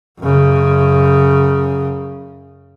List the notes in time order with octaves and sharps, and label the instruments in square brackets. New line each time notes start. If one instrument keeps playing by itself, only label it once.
[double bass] F#2 C#3